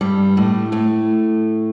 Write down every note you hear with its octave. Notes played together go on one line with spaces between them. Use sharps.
G2 G3
A2 A3
A2 A3